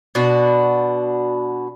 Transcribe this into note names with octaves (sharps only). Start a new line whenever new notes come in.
B2 D4 F#4